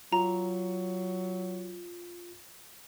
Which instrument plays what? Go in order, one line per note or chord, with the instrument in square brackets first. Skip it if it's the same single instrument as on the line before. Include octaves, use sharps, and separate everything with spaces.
[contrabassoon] F#3 [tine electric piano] F4 [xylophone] A#5